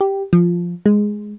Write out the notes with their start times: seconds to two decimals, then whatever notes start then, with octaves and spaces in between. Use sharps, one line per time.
0.01 G4
0.33 F3
0.86 G#3